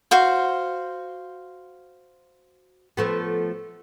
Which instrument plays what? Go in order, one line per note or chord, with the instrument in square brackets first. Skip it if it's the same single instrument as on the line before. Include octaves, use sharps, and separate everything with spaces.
[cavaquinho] F#4 C5 F5
[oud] F3 A3 B3